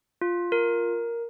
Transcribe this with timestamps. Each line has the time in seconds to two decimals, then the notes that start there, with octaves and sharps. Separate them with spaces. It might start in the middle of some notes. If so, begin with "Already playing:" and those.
0.21 F4
0.52 A#4